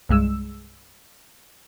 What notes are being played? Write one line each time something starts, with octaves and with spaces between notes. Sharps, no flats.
C2 G2 G#3 E6